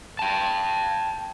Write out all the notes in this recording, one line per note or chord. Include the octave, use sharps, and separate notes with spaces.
G5 A5